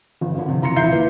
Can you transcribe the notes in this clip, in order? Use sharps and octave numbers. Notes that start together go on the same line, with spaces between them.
G1
G#1 D3
C3
F#1 A#5 C6 C#7
D#1 E4 F4 E5 G6 C7
A#3 E4 B4